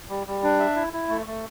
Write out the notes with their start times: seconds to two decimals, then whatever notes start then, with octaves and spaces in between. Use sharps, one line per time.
0.09 G3
0.27 G3
0.43 D4
0.60 E5
0.76 E4
0.93 E4
1.09 A3
1.26 A3